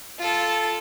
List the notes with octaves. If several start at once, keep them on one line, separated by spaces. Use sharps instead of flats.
F4 A4